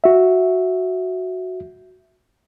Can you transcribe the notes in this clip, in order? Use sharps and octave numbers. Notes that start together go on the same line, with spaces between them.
F#4 E5